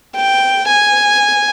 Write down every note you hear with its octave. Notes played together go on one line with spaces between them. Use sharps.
G5
G#5